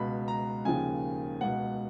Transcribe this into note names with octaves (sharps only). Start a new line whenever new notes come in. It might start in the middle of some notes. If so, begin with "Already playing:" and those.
Already playing: C#2 B2 B5
A#5
D#2 C#3 F3 G#5
C#2 B2 F#5